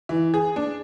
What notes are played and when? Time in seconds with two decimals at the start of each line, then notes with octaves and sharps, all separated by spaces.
0.09 E3
0.34 G#4
0.56 D4